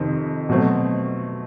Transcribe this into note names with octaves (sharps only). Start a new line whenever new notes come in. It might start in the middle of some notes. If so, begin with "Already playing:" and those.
Already playing: F2 C3 D#3 C4
B2 F#3 A3 C4